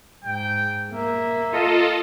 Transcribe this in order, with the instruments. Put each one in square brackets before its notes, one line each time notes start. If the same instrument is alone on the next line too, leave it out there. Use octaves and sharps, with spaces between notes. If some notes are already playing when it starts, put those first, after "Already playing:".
[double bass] G#2 [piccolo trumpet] G5
[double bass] A#3 [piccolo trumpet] E5
[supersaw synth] F4 A4 D#5